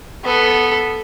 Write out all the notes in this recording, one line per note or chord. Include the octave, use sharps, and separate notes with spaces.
B3 A4